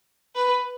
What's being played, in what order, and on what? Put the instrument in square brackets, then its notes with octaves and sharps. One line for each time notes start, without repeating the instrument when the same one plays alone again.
[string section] B4